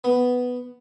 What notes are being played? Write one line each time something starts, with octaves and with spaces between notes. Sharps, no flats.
B3